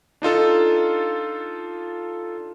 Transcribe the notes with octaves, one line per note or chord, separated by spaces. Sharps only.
D4 D#4 F4 A4